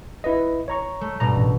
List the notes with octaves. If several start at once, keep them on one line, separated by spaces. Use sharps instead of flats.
E4 B4 D#5
C#5 A#5 C#6
A3
G2 B2 A#5
A1